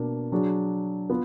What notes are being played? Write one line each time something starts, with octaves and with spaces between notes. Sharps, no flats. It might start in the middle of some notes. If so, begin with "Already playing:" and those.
Already playing: B2 A#3 D4
F#3 D4 G#4
B3 F4